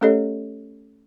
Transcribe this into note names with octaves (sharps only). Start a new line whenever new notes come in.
A3 C#4 G4 A4 C#5 D#5